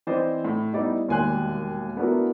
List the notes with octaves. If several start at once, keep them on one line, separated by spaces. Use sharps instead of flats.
E3 C4 C5 D5 D#5
A2
G3 B3 D#4 E4 D5
E1 D#2 G3 G#5 C6 F#6
A3 B3 D4 E4 F#4 A#4